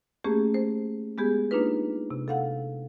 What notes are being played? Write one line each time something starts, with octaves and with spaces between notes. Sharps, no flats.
A3 A#3 C#4 G4 G#4
C5
G#3 B3 G4 G#4
A#3 D4 D#4 F4 B4
C3
A4 F5 F#5